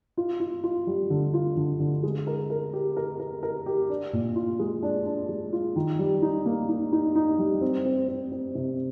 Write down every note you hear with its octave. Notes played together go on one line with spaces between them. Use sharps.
F4
F4
F4
G3
D3
F4
D3
D3
G#3
A#4
A#4
G4
A#4
A#4
A#4
G4
D4
A#2
F4
G#3
D4
D4
G#3
F4
D#3
G3
D#4
A#3
D#4
D#4
D#4
G3
C4
C4
C4
C4
C3